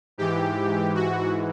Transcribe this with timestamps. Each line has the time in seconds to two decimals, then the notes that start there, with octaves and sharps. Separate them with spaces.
0.18 G#2 E3 G4
0.95 F#4